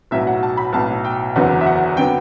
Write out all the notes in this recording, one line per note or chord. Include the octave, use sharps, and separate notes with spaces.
B1 A2 F#3 B3 E5
F#5
A5
B5
B1 A2 F#3 B3 A5
G5
F#1 E2 D3 F#3 B3 F#5
E5
F#5
D3 F#3 B3 G5